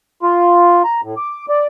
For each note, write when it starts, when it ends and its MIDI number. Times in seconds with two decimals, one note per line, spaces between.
0.23 0.83 65
0.84 1.01 82
1.04 1.15 45
1.17 1.46 86
1.49 1.67 74